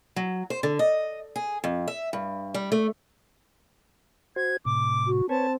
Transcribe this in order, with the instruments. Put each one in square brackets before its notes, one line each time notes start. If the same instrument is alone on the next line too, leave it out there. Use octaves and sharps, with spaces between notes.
[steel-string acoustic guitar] F#3
C5
D3
D#5
G#4
F2
E5
G2
G3
A3
[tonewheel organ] F#4 C5 [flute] G#6
[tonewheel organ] A2 C3 [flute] D6
[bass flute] F#4
[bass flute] C4 [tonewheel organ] B4 C#5 G#5 [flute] A5